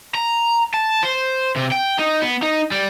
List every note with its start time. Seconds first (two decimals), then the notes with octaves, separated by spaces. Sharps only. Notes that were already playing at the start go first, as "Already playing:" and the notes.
0.15 A#5
0.74 A5
1.03 C5
1.56 C3
1.72 G5
1.99 D#4
2.22 B3
2.42 D#4
2.71 G3